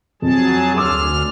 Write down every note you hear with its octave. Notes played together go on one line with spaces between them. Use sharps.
F2 F#3 G#4 A5
D2 C6 D6 E6 F6